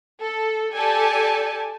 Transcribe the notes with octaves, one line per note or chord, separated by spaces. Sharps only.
A4
G4 A4 D5 G#5 A5